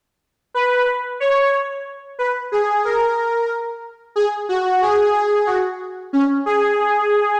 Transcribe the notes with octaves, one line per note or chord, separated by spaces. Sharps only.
B4
C#5
B4
G#4
A#4
G#4
F#4
G#4
G#4
F#4
C#4
G#4